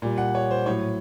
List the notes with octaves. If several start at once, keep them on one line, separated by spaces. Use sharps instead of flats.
A#2 G3
F#5
C#5
C5
A2 F#3 C#5